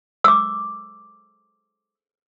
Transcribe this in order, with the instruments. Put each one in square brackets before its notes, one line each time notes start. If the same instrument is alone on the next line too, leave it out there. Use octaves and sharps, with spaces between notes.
[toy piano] D6 E6